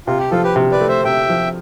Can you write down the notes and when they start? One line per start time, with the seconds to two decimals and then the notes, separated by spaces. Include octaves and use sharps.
0.07 C3 F4
0.19 G4
0.31 F3 F4 A4
0.44 G4 B4
0.56 C3
0.72 B4 D5
0.80 A3
0.89 C5 E5
1.05 C3 E5 G5
1.29 F3